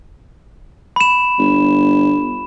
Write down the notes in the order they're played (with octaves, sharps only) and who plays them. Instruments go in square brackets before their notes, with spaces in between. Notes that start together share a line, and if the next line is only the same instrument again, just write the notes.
[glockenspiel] B5 E7
[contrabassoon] G1